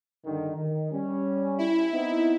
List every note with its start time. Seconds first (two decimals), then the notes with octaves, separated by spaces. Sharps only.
0.24 G2 D3 D#3
0.55 D#3
0.91 G3 C#4
1.58 E4
1.92 B3 C4 D#4